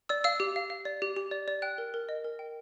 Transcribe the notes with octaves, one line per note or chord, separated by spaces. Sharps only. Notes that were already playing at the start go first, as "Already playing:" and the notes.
D5 E6
F5 E6
G4
F5
F5
D5
G4
G4
D5
D5
G5 F#6
A#4
A#4
D#5
A#4
G5